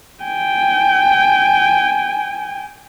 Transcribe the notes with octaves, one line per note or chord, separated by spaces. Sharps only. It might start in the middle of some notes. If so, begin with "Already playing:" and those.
G5 G#5